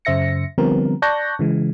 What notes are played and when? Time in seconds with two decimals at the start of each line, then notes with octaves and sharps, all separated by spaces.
0.05 F#2 C#3 C5 E5 A#6 C#7
0.58 D3 F3 G3 B3 C4 A#4
1.02 D5 A5 C#6 F#6 G6 A#6
1.39 C#3 E3 G#3